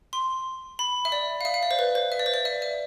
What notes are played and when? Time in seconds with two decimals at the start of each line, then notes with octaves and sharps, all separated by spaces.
0.13 C6
0.79 B5
1.05 E5
1.12 D5
1.41 F5
1.45 E5
1.54 F5
1.63 D5
1.71 C5
1.79 B4
1.95 C5
2.12 E5
2.19 D5
2.26 C5
2.34 D5
2.45 E5
2.62 E5